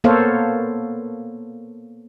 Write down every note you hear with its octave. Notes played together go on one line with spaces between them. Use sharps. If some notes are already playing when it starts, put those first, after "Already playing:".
A#3 B3 A4 C5 C#5 F5